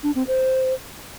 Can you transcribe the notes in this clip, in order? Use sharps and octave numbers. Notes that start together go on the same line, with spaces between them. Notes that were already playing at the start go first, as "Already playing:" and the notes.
D4
C4
C5